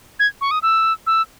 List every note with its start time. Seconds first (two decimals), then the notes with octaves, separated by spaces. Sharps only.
0.20 G#6
0.41 C#6
0.51 D#6
0.62 E6
1.07 E6